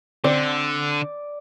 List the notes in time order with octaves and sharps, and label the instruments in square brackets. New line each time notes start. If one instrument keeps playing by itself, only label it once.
[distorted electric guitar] D3 [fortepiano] C4 [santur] D5